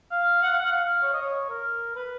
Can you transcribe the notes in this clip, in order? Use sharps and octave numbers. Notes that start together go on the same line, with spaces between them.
F5
F#5
F5
F#5
F5
C#5
D#5
C#5
A#4
B4